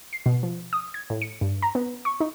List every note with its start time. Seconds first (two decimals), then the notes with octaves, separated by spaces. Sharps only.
0.13 C7
0.26 B2
0.43 F3
0.73 D#6
0.94 G#6
1.10 A2
1.22 C#7
1.41 G2
1.62 A#5
1.75 B3
2.05 C#6
2.20 D#4